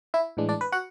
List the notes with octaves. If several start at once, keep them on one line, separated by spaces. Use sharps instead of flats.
E4 E5
A2 E3 G#3 D4
D4 D5
B4
F#4 F#5